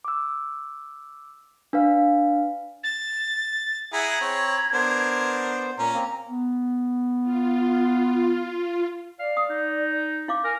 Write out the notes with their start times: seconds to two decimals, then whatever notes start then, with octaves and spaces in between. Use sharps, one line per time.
0.05 D6 E6
1.73 D4 B4 F5
2.84 A6
3.93 E4 G#4 F#5 A#5 B5 G#6
4.21 C4 C#5
4.74 B3 D4 A#4 C5
5.79 A#2 C#4 A#5
5.94 A#3 C4
6.28 B3
7.23 F4
9.19 D5 F5
9.37 D#6
9.49 D#4
10.28 E4 F5 D6
10.44 A#4 G#5